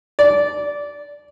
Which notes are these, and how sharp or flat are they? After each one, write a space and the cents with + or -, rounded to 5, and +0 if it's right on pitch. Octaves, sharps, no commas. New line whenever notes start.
D5 -15